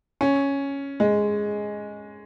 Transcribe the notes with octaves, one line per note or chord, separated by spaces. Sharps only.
C#4
G#3